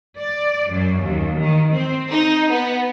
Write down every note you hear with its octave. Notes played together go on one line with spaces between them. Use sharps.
D5
F#2
D#2
D#3
C4
D#4
B3